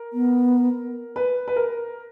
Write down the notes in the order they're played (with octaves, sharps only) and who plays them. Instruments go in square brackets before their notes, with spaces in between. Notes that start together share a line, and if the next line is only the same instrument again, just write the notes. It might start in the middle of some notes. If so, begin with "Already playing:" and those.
Already playing: [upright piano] A#4
[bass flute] B3
[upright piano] B4
B4
A#4